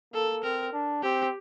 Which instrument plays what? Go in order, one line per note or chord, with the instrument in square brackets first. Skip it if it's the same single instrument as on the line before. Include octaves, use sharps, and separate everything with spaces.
[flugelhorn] A#3 [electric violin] A4
[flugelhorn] C4 [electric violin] A#4
[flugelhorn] D4
[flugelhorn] C4 [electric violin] G4